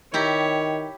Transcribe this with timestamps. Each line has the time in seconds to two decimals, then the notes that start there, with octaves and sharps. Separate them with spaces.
0.14 D#3 E4 G4 C#5 A#5